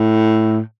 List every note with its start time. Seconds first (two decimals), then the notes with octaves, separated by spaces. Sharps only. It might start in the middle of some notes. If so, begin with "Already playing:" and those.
Already playing: A2